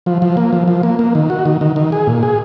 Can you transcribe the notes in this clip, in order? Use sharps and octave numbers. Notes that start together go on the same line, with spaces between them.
F3
F3
A#3
F3
F3
A#3
A#3
D#3
F#4
D#3
D#3
D#3
G#4
A#2
G#4